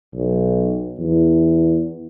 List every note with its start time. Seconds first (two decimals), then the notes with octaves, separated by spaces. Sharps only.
0.14 B1
0.98 E2